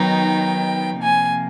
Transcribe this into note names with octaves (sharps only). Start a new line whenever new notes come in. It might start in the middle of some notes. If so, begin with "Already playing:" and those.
Already playing: D#3 F#3 B3 D#4 G5
C3 F3 A#3 G#5